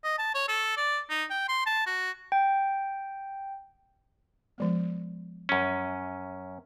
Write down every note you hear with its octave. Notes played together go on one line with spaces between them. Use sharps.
D#5
A5
C#5
A4
D5
D#4
G5
C6
A5
F#4
G5
F3 G#3 B3
F#2 C#4